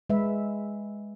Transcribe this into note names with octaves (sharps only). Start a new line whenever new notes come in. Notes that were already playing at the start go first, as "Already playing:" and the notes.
G#3 B4 E5